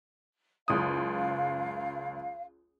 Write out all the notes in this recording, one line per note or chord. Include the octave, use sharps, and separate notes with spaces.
F#1 C#2 F5 D#6